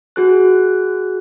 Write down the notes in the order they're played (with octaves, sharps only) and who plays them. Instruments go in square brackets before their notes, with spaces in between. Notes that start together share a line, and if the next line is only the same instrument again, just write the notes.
[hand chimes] F#4 G#4 F#6